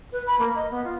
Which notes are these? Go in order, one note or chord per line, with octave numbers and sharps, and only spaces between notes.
B4
B5
A#3
D#5
B3
F4